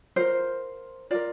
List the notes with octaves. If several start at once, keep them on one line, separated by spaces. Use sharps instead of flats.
F4 A#4 C5
F4 A#4 D5